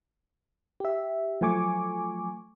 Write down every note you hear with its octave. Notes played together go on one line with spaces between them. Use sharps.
G4 E5
F3 F#3 A3 G#5 C#6 D6